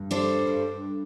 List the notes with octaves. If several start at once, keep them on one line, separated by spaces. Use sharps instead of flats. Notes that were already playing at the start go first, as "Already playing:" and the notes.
Already playing: G2
G3 D4 A4 C5
F2
G2